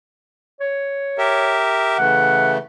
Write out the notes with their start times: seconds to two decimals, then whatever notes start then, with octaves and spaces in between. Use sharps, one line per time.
0.60 C#5
1.18 G4 A#4 E5
1.98 C#3 E3 A3 F#5